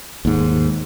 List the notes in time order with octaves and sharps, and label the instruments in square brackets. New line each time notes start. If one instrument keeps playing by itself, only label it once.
[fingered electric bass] D#2 G#2